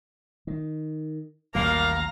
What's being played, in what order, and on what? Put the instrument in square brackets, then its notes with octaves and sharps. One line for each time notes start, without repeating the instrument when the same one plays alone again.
[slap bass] D#3
[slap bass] A1 D#2 F#3 [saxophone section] G3 A#3 [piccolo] F5 [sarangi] A#5